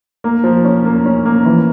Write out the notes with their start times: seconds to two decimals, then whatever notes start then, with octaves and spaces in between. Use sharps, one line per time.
0.24 A#3
0.44 F3
0.65 C#4
0.85 A#3
1.05 C#4
1.26 A#3
1.45 E3